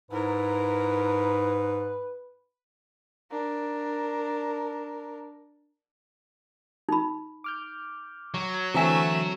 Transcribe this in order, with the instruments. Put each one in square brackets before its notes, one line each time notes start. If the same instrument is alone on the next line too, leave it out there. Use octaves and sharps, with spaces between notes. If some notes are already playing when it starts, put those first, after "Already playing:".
[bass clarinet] G#2 [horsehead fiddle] E4 A#4 [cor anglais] B4
[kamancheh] D4 A#4
[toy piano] D#4 B5
[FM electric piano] D6 F6 G6
[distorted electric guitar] F#3
[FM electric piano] D3 E3 C4 [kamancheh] A3 E5 [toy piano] E4 G#5